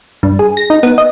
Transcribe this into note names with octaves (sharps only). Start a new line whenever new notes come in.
G2
G#4
A#6
D#4
B3
D#5